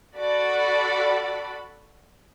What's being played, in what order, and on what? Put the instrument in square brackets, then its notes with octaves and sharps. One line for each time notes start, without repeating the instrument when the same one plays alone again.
[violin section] F#4 A4 D5 B5